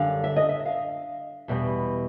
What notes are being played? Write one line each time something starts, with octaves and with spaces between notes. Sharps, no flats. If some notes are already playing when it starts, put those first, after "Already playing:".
Already playing: F#2 D3 G3 F5
E5
D#5
E5
F5
E2 B2 G3